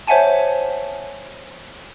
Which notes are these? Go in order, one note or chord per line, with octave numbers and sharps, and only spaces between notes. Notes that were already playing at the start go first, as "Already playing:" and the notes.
C5 C#5 E5 F#5 G#5 A5